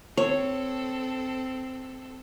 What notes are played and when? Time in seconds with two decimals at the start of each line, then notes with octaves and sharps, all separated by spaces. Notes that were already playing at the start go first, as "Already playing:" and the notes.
0.17 C4 A4 C#5